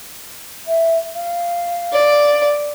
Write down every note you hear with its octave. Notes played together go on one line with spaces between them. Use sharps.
E5
F5
D5